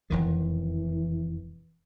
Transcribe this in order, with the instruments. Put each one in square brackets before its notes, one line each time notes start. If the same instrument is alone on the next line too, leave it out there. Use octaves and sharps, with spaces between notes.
[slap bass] E1 F2 D#3 [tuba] E3